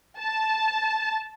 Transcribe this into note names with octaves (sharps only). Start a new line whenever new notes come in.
A5